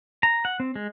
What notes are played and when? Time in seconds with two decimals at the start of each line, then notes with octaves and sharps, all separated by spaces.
0.23 A#5
0.45 F#5
0.60 C4
0.76 G#3